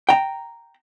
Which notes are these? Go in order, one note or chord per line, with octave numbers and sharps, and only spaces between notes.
G5 A#5